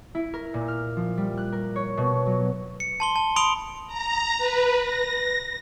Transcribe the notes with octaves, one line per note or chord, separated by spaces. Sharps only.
E4
A#4
A#2
F6
F3
G3
F#6
A#4
C#5
B2
F#3
C#7
A5 C6 G7
A5
B5 C6 D#6 D7 F7 G7
A#5
B4
A#6